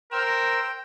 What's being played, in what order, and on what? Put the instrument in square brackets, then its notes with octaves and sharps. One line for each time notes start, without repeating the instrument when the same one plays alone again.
[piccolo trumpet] A#4 [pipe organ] C5 E6 [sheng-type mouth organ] G5